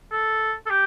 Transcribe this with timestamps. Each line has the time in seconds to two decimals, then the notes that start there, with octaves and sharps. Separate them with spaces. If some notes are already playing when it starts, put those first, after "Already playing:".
0.12 A4
0.66 A4
0.70 G4